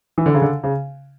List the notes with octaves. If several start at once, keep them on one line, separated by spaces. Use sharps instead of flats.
E3
D3
C#3
D3
C#3